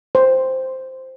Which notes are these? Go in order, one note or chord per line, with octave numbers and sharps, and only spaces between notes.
C5